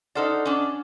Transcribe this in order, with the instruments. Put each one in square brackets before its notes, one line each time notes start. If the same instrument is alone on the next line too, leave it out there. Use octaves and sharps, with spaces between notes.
[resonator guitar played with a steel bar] D#4 A4 C5 [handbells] D5 F#5 F6
[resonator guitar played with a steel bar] C#4 D4